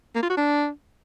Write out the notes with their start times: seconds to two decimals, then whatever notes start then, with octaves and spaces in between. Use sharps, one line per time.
0.15 A#3
0.22 F4
0.30 F#4
0.37 D4